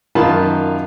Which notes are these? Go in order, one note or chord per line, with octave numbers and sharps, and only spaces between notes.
F#2 D#3 F4 F5 A5 B5